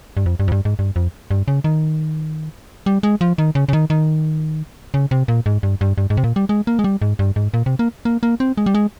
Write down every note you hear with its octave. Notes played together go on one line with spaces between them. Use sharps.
G2
F2
G2
F2
G2
G#2
G2
F2
G2
C#3
D#3
G3
G#3
F3
D#3
C#3
C#3
D#3
D#3
C#3
C3
A#2
G#2
G2
G2
G2
G#2
C3
A#2
G3
G#3
A#3
G#3
G3
G#2
G2
G#2
A#2
C3
A#3
A#3
A#3
C4
G#3
G3
G#3